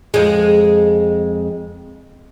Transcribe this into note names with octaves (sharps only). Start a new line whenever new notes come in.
F2 G#3